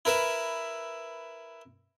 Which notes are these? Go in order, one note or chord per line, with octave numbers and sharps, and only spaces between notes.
E4 A#4 B4 E5